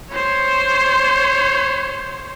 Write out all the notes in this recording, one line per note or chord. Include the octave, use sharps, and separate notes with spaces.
C5 C#5